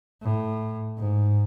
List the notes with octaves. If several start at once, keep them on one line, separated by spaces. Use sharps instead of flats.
A2
G#2